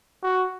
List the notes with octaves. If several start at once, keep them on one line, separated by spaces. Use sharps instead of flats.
F#4